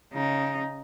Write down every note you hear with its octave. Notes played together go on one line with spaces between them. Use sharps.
C#3 D#4